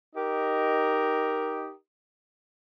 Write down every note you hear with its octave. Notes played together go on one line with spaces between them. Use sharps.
D#4 G4 A#4 D#5